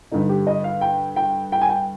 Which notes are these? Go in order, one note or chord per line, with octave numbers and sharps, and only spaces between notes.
G2 D3 D#4
G4
D#5
F5
G5
G5
G5
G#5
G5